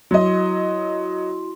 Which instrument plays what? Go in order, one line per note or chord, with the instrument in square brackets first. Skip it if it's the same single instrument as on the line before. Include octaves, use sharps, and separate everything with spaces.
[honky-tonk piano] F#3 D#5 [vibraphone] E4 F#4 C6